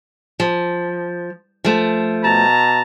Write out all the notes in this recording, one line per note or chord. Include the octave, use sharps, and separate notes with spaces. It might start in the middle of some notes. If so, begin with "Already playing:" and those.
F3
F3 A3
B2 A5 A#5